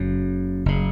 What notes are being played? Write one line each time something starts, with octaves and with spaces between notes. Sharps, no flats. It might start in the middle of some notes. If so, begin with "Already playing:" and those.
Already playing: F#1 F#2 C#3
F#1 C#3